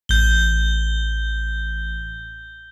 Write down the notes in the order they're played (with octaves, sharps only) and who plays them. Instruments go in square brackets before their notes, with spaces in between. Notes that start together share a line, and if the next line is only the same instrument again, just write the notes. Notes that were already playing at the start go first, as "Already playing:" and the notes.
[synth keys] A1 [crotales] G6 G7